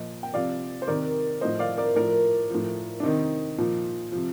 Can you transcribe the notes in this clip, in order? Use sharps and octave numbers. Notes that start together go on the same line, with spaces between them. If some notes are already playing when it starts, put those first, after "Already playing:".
Already playing: A#2 F3 D#5
G5
C3 F3 D5 F5
C5
C3 D#3 A#4 D5
A2 F3 C5 D#5
D5 F5
A#4 D5
A2 F3 A#4 D5
A2 F3
D4
C3 D#3 C4 D#4
A#2 F3
C3 F3